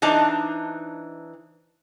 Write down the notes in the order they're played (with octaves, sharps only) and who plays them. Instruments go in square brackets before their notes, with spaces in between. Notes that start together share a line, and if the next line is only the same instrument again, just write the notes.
[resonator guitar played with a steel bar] E3 D4 D#4 C5 A5